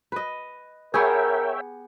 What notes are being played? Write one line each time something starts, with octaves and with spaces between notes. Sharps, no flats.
B4 D#5
B3 G4 G#4 A#4 C#5 E5 G5